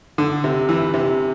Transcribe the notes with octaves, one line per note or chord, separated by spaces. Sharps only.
D3
C3
E3
C3